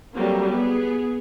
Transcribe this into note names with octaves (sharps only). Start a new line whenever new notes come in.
F#3 G3 A3 A#3 C4
B3 G#4